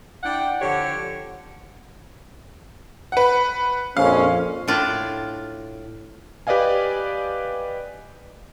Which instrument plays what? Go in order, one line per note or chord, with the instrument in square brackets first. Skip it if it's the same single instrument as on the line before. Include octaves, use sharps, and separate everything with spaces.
[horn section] D4 E4 F#5 G5
D3 F3 G4 C#5
[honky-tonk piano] B4 F#5
[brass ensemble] A#1 F2 C#4 [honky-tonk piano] F5
[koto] A2 D4 F4 D5
[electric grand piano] G4 B4 D5 D#5 F5 G#5